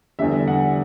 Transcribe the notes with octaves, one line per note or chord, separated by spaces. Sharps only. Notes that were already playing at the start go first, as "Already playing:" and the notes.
E2 D3 G3 E5
F#5